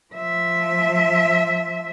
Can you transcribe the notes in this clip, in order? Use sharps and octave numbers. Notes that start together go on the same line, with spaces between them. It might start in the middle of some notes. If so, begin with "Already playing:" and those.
F3 E5